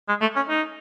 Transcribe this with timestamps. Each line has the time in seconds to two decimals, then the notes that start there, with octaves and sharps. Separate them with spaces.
0.09 G#3
0.21 A3
0.36 C#4
0.49 D#4